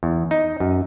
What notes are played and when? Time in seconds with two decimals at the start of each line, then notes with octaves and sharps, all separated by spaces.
0.03 E2
0.31 D#4
0.60 F#2